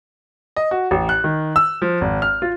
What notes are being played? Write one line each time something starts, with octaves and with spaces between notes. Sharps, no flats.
D#5
F#4
A1
F#6
D#3
E6
F3
G#1
F6
F4